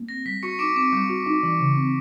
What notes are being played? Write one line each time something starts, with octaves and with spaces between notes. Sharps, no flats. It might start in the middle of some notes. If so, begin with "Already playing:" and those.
Already playing: A#3
C4 A#6
G3 B6
F#4 C#6 C#7
D#4 D6 D7
C4 D6 D7
G3
F#4
D#4
E3
C#3
C4